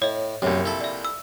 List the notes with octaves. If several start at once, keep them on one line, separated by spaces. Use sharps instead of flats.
A2 C#5 D#5
A#1 F#2 C3
E4 A4
D5 E5
E6